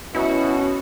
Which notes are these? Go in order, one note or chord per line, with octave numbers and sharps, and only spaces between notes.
B2 C#4 E4 F#4